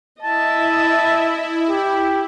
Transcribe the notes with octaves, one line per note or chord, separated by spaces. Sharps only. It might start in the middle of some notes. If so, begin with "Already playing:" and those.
E4 D#5 E5 A5
G4